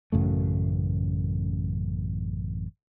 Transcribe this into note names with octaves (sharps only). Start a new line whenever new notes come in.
A1 F#2 C#3 A3